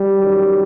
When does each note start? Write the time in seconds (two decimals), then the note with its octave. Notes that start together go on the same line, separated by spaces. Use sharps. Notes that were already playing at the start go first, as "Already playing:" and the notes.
Already playing: G3
0.19 F#2 D#3 F#3